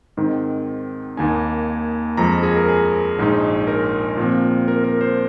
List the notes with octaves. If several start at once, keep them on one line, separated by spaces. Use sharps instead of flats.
G#2 D#3 C4
D#2 D#3 A#3 D#4 G#5
F2 F3 G#3 A#5
G#4
A#4
G#4
A#1 G#2 G#3 D#4
A#4
A#2 F3 C4
A#4
A#4
C5